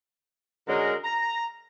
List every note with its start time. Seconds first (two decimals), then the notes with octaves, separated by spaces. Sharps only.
0.68 D3 G#3 C#4 F#4 A#4
1.04 A#5